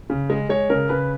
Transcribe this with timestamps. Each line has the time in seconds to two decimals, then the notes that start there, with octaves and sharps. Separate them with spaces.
0.10 C#3
0.30 G#3
0.49 G#3 C#5
0.70 C#3 A#4
0.89 C#3 B4